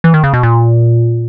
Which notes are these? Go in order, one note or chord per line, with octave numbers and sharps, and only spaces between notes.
E3
D#3
C#3
B2
A#2